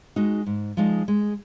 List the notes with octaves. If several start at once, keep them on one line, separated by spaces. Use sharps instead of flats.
G#3 D#4 F#4
G#2
F3 G#3 D#4
G#3